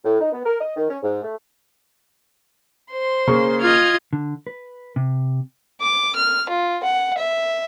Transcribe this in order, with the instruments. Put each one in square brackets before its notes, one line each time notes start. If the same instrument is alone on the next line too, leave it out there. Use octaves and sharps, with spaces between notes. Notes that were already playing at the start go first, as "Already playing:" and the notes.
[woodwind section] A2
D#4
B3
A#4
D#5
D#3
C#4
G#2
A3
[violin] C5 C6
[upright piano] C#3 A#3 C#6
[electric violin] F4 D#5 [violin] F6 G#6
[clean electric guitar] D3
B4
C3
[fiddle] D6
F6
F4
F#5
E5